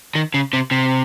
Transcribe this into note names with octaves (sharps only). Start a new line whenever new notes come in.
D#3
C#3
C3
C3